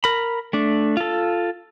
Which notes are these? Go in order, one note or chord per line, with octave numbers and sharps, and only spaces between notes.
A#4 B5
A3 D4
F4 A4